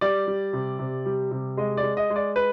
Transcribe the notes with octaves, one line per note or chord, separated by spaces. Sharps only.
G3 D5
G3
C3
C3
G3
C3
G#3 D#5
D5
G#3
D#5
G#3
D5
B4